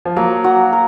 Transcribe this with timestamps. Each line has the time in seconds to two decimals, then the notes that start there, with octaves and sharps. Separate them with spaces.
0.05 F3
0.16 F#3 A#3
0.44 F#4
0.73 A#4